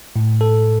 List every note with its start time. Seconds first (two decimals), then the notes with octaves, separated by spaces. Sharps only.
0.16 A2
0.41 A4